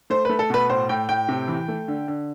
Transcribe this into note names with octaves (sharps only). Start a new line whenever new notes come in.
A3 C5
A3 B4
A4
B2 B4
A2 C5
A2 G5
A2 G5
C3
E3
A3
D3
D3